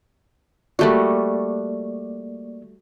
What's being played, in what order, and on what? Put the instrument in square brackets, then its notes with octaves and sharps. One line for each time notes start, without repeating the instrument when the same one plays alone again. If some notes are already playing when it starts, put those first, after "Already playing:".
[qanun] G3 A3 F#4 [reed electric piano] A#3 D5